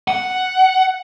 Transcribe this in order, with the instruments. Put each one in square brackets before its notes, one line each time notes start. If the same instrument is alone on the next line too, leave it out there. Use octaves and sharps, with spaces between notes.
[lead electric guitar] F#5